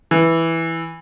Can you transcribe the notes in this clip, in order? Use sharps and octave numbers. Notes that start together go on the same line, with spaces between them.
E3